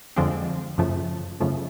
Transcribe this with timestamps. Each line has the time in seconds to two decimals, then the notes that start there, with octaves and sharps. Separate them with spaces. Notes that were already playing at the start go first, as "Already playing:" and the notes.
0.16 F2 D3 F3 G#3 C4
0.78 F#2 C#3 F3 A3
1.40 F#2 C#3 F3 A3